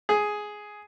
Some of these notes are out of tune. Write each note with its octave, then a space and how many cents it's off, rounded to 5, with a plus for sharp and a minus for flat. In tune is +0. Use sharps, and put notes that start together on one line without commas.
G#4 +5